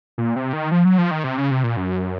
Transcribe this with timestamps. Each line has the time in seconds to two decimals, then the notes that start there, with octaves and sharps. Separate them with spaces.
0.18 A#2
0.36 C3
0.53 D#3
0.71 F3
0.85 F#3
0.98 F3
1.11 D#3
1.24 C3
1.38 C#3
1.51 C3
1.64 A#2
1.77 F#2